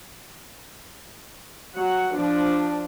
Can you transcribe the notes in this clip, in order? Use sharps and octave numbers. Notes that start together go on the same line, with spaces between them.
F#3 F#5
F3 D4